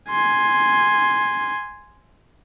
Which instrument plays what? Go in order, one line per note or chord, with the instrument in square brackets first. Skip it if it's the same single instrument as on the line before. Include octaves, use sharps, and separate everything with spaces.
[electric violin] G#5 C6